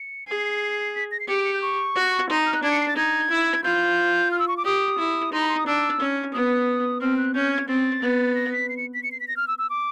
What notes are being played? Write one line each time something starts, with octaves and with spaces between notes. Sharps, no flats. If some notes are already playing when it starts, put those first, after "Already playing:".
Already playing: C#7
G#4 C7
B6
A#6
C7
G4 C#7
D7
C#7
G6
C#6
F#4
D#4 C6
F6
F#6
D4 G#6
C#7
C7
A6
D#4 G#6
E4
F4 G6
F6
E6
C#6
D6
G4 D#6
E4
D#4 C6
B5
C6
D#6
D4 E6
C#4
B3 D#6
C4 F6
F#6
C#4 G6
G#6
C4 A6
B3
A#6
B6
C7
C#7
B6
C#7
C7
B6
A#6
F6
E6
E6
D6